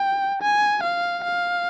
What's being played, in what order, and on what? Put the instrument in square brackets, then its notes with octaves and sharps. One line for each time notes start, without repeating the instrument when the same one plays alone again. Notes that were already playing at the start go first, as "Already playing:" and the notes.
Already playing: [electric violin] G5
G#5
F5
F5